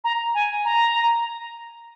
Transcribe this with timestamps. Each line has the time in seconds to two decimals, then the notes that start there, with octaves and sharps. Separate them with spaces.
0.04 A#5
0.34 G#5
0.64 A#5